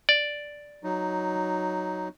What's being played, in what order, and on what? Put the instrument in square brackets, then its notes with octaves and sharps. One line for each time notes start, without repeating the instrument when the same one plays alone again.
[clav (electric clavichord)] D5
[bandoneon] F#3 D#4